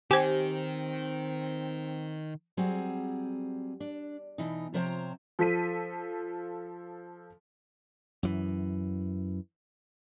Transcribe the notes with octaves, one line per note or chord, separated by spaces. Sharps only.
D#3 C4 G4 C5 G#5
F#3 G3 C4 G#4
D4
B2 E3 D#4
C3 F3 C5 C#5 G5 A#5
F3 A4 B6 D#7
F#2 E3